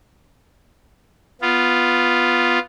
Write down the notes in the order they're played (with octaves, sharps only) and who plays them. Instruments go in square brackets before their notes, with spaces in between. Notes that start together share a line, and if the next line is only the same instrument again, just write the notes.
[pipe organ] B3 F4